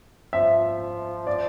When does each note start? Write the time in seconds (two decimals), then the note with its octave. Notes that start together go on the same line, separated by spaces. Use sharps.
0.33 F3 E5
1.27 D5